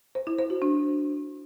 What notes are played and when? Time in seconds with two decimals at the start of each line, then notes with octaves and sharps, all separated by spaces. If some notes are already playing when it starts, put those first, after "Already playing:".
0.15 C5
0.27 E4
0.38 C5
0.50 F#4
0.62 D4